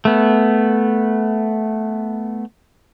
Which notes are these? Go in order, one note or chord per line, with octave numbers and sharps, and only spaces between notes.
A3 B3